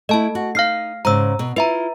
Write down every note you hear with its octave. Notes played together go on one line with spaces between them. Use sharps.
A3 E4 D#5 A5
F#4
D#4 F5 F6 C7
G#2 C#3 A#5 E6
B2
E4 F4 B4 E5 A#5